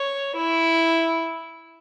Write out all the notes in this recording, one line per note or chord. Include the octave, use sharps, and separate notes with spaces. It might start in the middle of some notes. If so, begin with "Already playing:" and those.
Already playing: C#5
E4